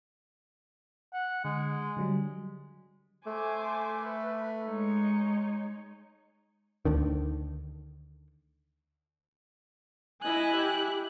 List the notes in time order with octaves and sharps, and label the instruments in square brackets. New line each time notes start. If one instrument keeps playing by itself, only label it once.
[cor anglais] F#5
[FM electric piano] D3 [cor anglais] G#3
[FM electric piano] D3 F#3 G3
[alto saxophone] A3 [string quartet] C5 G#5 D6
[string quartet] B4
G#3 D#4 C#5
[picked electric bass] D2 D3 D#3
[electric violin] E4 F#6 [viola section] D#5 G#5
[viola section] G4